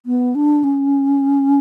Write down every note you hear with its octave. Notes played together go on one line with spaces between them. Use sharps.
B3
D4
C#4